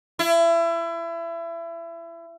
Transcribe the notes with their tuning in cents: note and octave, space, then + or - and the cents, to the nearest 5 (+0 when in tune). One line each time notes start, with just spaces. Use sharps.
E4 +30